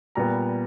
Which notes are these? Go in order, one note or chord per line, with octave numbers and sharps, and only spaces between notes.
A#2 G3 B3 A#5